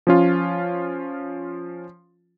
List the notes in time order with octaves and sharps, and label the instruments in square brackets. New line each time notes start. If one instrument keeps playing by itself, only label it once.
[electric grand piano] F3 C#4 F4